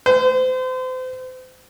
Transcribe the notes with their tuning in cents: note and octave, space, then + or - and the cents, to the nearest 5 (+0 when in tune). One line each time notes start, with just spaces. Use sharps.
C5 -35